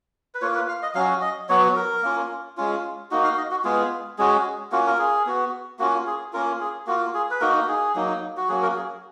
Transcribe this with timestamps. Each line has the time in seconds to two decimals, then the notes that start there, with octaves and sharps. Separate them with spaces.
0.34 B4
0.41 A#3 F4 C#5
0.55 B4
0.68 F5
0.82 D#5
0.95 F#3 C#4 F#4 F5
1.22 D#5
1.49 F#3 B3 F#4 C#5
1.76 A#4
2.03 A#3 C#4 F4
2.57 G#3 C#4 F4
3.11 A#3 D#4 F#4
3.24 F5
3.38 D#5
3.51 F#4
3.64 G#3 B3 F4 G#4
4.18 G#3 C#4 F#4 G#4
4.72 A#3 C#4 F4 F#4
4.86 A#4
4.99 G#4
5.26 B3 F#4
5.79 A#3 C#4 F4 F#4
6.07 G#4
6.33 A#3 C#4 F4 A#4
6.61 G#4
6.87 A#3 F4 F#4
7.14 G#4
7.31 B4
7.40 A#3 D#4 F#4 A#4
7.68 G#4
7.95 F#3 A#3 D#4
8.37 F#4
8.48 F#3 A#3 C#4 F#4 G#4
8.62 A#4
8.76 G#4